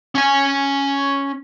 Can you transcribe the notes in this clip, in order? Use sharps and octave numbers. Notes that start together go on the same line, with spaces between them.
C#4 G#5